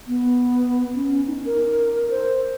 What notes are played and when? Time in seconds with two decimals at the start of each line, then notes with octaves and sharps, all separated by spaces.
0.08 B3
0.95 C#4
1.27 D#4
1.45 A#4
2.10 C5